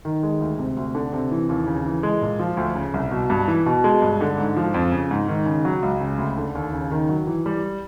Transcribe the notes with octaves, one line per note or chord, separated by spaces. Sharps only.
D#3
G#3
D2
C3
D2
D3
C3
E3
D#2
C#3
E3
G#3
A#2
F3
D2
C#3
C2
B2
G2
E3
B2
G#3
G2
D3
G#2
F3
F2
C#3
G#2
D#3
C#3
F#3
C#2
C#3
D2
D3
D#2
C#3
D#3
F#3
E3
G3